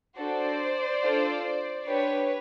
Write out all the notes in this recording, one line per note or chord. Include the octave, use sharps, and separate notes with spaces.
D4 F#4 A4 C5 D5
D4 F4 A4
D4 G4 B4 C#5